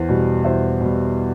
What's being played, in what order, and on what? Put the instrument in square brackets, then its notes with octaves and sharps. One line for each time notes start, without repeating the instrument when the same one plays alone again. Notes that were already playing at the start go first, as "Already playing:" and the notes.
Already playing: [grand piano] E2 C5
B2 G3
E2 C5 E5
B2 G3